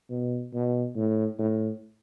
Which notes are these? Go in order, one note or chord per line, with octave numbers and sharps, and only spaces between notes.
B2
B2
A2
A2